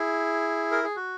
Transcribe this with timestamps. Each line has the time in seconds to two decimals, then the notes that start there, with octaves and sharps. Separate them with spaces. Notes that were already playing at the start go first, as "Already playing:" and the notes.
Already playing: E4 G#4
0.71 A#4
0.84 G#4
0.96 F#4